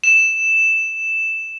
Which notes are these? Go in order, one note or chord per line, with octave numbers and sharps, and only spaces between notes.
E7